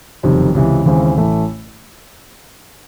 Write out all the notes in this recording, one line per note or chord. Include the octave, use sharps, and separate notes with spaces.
F#1 F2 C3 D#3 G3
C#2 C3 E3
D#2 C#3 E3 G#3 C4
A1 A2 E3 A3